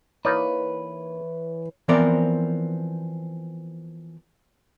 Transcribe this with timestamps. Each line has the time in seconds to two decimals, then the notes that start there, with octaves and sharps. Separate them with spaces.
0.25 E3 A#3 D#4 B4 C#5 D5
1.88 E3 F3 B3 C4 A#4 D5